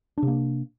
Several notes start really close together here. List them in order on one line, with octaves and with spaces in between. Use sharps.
D4 C3 A#3